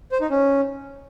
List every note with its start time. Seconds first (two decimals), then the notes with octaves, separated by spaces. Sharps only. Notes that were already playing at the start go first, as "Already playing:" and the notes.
0.12 C5
0.21 D#4
0.30 C#4